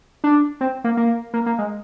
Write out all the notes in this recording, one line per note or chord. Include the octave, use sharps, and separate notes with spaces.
D4
C4
A#3
A#3
A#3
A#3
G#3